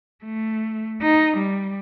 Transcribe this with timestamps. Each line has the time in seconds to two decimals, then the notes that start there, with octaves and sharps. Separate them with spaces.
0.24 A3
1.02 D#4
1.37 G3